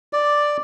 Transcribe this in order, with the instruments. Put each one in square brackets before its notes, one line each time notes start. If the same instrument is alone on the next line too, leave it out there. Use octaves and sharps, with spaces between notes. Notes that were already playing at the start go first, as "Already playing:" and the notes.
[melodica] D5